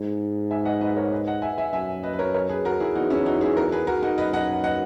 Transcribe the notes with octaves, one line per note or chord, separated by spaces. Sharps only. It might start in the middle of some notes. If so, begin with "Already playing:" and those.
Already playing: G#2
E5 G#5
D#5 F#5
B4 D#5
A#4 C#5
G#4 B4
D#5 F#5
E5 G#5
E5 G#5
F#2 E5 G#5
B4 D#5
B4
A#4 C#5
A#4 C#5
G#4 B4
F#4 A#4
E4 G#4
E2 D#4 F#4
C#4 E4
D#4 F#4
E4 G#4
F#4 A#4
G#4 B4
F#4 A#4
D#4 F#4
F#2 B4 D#5
D#5 F#5
D#5 F#5